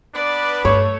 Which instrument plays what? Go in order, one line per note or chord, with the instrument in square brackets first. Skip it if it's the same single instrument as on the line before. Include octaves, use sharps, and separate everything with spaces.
[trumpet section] B3 D4 B4 [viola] D5
[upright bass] G2 [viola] A3 [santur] C#5